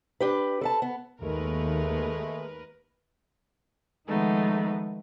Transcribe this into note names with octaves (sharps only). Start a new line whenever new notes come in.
D4 G4 B4
A4 B4 A5
B3
D#2 G#3 A3 A#4 B4
D#3 F3 G#3 A3 B3 D#4